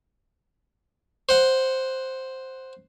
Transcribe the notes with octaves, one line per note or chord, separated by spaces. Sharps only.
C5 F#5